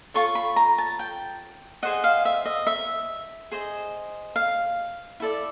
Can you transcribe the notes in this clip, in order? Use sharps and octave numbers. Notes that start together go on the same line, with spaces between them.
F4 A4 C#5 C#6
B5
A#5
A5
G5
G#4 C5 D#5 F#5
F5
E5
D#5
E5
G#4 C5 D#5
F5
E4 A4 D5